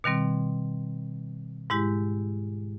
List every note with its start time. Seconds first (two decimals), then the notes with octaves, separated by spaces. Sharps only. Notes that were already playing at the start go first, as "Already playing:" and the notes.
0.04 B2 D#3 G3 C4
1.70 G#2 G#3 E4 G4